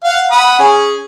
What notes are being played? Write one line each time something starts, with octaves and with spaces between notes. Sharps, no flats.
F5 F#5
F#5 B5 D#6
C#4 G#4